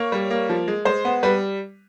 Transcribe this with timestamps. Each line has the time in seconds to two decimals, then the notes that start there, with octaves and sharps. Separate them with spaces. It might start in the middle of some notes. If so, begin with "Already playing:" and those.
Already playing: A#3 C#5
0.12 G3
0.30 A#3
0.50 F3
0.68 G#3
0.85 G#3 C5
1.05 B3
1.23 G3 B4